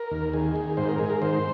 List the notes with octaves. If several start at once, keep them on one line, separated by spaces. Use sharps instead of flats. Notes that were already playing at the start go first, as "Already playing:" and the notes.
Already playing: A#4
D#2
D#3 G#4
D#3
G#2 C5
A#4
G#2 G#4
A#4
D#3 C5